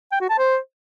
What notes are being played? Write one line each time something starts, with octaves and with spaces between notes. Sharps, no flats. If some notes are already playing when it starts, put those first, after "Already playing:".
G5
F#4
A5
C5